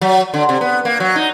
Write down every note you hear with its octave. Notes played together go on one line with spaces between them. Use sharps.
F#3
D3
C3
B3
A#3
F#3
D#4